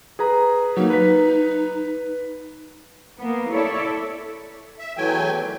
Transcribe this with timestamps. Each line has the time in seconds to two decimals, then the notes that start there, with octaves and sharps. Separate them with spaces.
0.19 G#4 B4 A#5
0.77 F#3 A#3 D#4
0.90 B4 B6
3.19 A#3 B3
3.51 E4 A4 C#5 D5 E5
4.79 E5
4.97 E2 E3 F#3 A3 G5 G#5
5.36 D#3